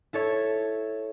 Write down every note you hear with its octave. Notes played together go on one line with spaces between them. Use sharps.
E4 A4 C#5